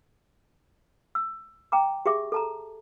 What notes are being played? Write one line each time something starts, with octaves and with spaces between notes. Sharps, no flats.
E6
G5 A#5 D6
G4 G#4 E5 D6
A4 A5 A#5